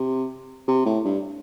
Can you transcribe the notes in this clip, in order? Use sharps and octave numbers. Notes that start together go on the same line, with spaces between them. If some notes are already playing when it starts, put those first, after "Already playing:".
Already playing: C3
C3
A2
G2